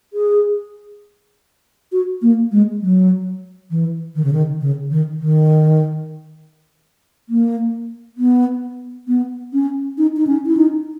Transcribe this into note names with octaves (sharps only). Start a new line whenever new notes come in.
G#4
F#4
A#3
G#3
F#3
E3
D#3
C#3
D#3
C#3
D#3
D#3
A#3
B3
B3
C#4
D#4
D#4
C#4
E4
D#4